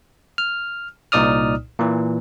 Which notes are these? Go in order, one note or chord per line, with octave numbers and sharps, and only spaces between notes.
F6
C2 A#2 D#4 D5 D#6 F6
A#2 E3